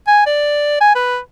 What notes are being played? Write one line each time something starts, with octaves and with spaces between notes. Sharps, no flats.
G#5
D5
G#5
B4